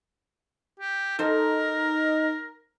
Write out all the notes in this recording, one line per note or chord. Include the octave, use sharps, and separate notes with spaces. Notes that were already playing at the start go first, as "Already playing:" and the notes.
G4
D#4 A4 A#4 C5